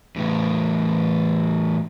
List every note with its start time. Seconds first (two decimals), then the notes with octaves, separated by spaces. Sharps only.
0.16 E2 A2